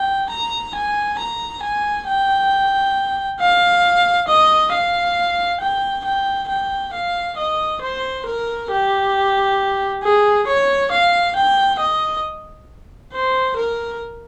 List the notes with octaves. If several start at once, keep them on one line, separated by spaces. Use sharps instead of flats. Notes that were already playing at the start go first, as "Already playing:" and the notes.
Already playing: G5
A#5
G#5
A#5
G#5
G5
F5
D#5
F5
G5
G5
G5
F5
D#5
C5
A#4
G4
G#4
C#5
F5
G5
D#5
C5
A#4